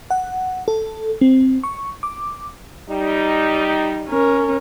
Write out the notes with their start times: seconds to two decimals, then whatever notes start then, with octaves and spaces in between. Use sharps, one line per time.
0.10 F#5
0.68 A4
1.21 C4
1.64 C#6
2.03 D6
2.90 G3 D#4
4.08 C#4 A#4